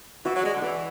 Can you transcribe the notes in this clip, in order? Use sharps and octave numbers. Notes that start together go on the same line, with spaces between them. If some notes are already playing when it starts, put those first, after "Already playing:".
E3 F#4
F#3
G#3 D5
D3
E3 D5